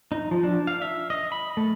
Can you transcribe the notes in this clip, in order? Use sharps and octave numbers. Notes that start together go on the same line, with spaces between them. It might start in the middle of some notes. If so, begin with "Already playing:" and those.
D#4
F3
D4
F5
E5
D#5
B5
A3